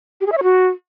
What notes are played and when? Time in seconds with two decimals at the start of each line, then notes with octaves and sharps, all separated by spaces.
0.21 G4
0.26 G#4
0.32 E5
0.37 C#5
0.43 F#4